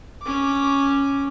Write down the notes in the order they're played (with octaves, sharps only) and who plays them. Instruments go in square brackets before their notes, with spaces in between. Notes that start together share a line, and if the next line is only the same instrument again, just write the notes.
[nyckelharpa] C#4 D6